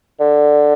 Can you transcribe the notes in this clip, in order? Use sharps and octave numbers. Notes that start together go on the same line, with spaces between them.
D3